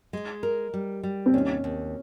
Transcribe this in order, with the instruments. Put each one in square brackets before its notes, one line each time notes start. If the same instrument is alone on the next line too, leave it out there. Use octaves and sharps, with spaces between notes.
[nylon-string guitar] G#3
A#4
G3
G3
[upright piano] C4
[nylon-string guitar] D#2 [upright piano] C#4
[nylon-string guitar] D#2